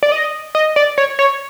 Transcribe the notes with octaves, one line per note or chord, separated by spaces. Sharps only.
D5
D#5
D#5
D5
C#5
C#5